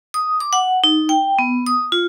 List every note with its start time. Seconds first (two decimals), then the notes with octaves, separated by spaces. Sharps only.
0.14 D#6
0.40 D6
0.53 F#5
0.84 D#4
1.09 G5
1.39 B3
1.66 D#6
1.92 F4